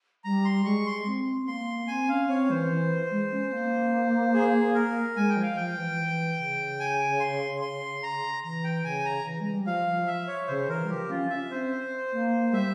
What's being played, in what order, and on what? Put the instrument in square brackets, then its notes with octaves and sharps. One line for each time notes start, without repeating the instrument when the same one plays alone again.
[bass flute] G3 [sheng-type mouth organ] A#5
[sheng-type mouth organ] C6
[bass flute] G#3 [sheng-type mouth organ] C#6
[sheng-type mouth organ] C6
[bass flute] C4
C4
[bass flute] A#3 [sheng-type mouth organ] C6
[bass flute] C4 [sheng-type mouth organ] G#5
[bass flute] C#4 [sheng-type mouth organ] F5
[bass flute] C4 [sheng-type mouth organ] C#5
[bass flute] E3 [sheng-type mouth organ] C5
[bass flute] E3
G#3
C#4
A#3
[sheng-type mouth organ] G#4
A#4
[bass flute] G#3 [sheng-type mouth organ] G#5
[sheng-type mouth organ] G5
[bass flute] F3
[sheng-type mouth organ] F5
[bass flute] F3 [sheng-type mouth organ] G5
[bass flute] E3
E3
C#3
[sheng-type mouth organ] G#5
C6
C6
A#5
[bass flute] E3 [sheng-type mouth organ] A#5
[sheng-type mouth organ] G5
[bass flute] C#3 [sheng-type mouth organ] G#5
[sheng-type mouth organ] A#5
[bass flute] E3
G#3
G3
[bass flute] F3 [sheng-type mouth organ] F5
[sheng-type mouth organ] E5
C#5
[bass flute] C#3 [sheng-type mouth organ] C5
[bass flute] E3 [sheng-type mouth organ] A#4
[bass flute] G3
[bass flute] F3 [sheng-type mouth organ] G4
[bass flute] C#4 [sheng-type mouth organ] F4
[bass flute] C#4 [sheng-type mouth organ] E5
[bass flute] C4 [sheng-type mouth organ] C5
[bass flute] A#3
[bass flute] G3 [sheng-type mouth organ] E5